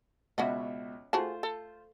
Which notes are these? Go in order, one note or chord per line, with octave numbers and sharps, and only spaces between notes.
C#2 B2 C#4 F#4 D#5 E5
A3 F4 F#4 G#4 C5 A5
A4